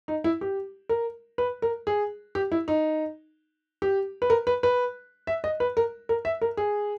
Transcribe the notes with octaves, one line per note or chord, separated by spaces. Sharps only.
D#4
E4
G4
A#4
B4
A#4
G#4
G4
E4
D#4
G4
B4
A#4
B4
B4
E5
D#5
B4
A#4
A#4
E5
A#4
G#4